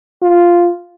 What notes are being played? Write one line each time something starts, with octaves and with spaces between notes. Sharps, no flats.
F4